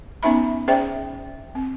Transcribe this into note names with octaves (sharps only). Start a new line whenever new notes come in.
B3 C#4 D#4 E5 B5
C#4 G#4 C5 D5 E5 G5
C4